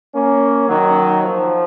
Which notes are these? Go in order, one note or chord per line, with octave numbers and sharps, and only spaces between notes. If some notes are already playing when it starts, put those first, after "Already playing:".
A#3 C#4
D#3 F#3
F3